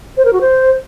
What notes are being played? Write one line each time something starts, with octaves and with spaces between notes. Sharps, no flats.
C5
A#4
F#4
C5